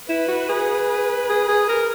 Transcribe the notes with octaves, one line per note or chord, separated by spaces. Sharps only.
E4 B4
F#4
G#4
B4
G#4
G#4
A#4